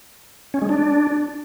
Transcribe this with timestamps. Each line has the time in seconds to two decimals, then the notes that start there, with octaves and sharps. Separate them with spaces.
0.54 C#4
0.62 G#3
0.69 D4